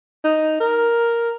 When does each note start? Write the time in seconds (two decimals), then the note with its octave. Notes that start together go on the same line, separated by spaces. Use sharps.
0.24 D#4
0.60 A#4